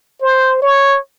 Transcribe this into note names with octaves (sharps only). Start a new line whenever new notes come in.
C5
C#5